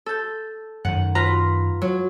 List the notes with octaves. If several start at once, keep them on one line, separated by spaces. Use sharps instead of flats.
A4 G6
F#2 D#3 F#5
F4 B4 A#5
F#3